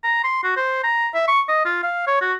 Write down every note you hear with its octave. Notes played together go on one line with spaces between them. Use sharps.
A#5
C6
F#4
C5
A#5
E5
C#6
D#5
F4
F5
C#5
F#4